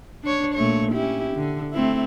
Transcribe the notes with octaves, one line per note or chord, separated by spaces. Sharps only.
D4 C#5
A#2 A3 C#5
C#4 E4 G4
D3
A3 C4 E4